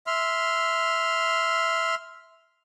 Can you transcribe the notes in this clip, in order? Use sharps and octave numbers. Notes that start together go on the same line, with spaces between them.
E5 C6 F6